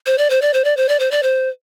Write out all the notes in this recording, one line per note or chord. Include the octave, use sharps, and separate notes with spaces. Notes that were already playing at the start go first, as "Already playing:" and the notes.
C5
D5
C5
D5
C5
D5
C5
D5
C5
D5
C5